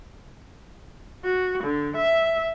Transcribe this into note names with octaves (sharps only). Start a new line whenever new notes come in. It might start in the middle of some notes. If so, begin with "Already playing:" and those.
F#4
D3
E5